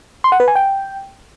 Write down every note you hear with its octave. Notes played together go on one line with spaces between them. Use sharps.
C6
F#5
B4
G#5
G5